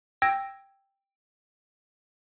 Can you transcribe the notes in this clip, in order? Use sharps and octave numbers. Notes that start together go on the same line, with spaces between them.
G5 E6 G#6 A#6